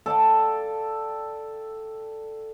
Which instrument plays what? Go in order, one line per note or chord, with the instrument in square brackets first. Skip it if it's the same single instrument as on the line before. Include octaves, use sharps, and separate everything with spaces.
[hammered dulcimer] A4 D5 F5 G5